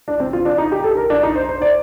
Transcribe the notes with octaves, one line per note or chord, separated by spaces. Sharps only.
D4
C4
F4
D4
D#4
G4
A4
A#4
D4
D#4
C5
C5
D5